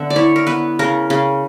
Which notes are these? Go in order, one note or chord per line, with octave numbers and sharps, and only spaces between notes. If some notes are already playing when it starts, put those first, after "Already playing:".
Already playing: D3 B3 E5 F#5
D5
E4 C#5
A#4
B3 B4
C#3 A#4
C#3